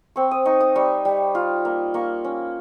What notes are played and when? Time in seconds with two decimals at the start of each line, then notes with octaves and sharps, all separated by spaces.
0.16 C4 C#6
0.31 D#6
0.45 D#4 C#6
0.61 D#6
0.76 G3 C#6
1.05 G3
1.35 F4
1.65 A#3
1.94 A#3 C#6
2.24 C#4